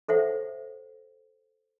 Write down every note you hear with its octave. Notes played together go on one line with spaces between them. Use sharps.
A4 C5 C#5 E5 F#5